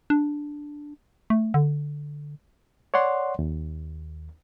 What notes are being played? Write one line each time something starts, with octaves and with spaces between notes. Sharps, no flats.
D4
A3
D3
C#5 D5 F#5 C6
D#2